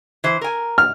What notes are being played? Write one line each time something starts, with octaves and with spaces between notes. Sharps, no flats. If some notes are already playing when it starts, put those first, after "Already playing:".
E3 C5
A#4 G#5
F6